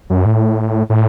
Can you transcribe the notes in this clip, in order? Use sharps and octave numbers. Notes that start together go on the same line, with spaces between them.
F#2
A2
A2